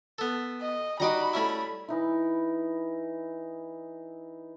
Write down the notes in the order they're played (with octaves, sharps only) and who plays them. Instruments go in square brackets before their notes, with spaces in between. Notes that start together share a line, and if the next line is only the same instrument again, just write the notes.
[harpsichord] B3 A4
[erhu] D#5
[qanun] G3 F#4 D6 [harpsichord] D#4 D#5 A#5 [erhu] B5
[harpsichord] A3 C#4 E4
[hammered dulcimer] E3 D#4 E4